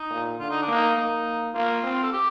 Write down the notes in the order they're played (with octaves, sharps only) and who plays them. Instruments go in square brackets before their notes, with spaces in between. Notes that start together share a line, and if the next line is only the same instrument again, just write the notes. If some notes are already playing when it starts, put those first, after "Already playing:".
Already playing: [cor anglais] D#4
[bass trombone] A#2
[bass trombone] D3 [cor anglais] F4
[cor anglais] D#4
D4
[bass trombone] A#3
[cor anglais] D#4
[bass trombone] A#3 [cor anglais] D#4
[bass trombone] A#3 [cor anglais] F4
[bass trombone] C4
[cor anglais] A4
G4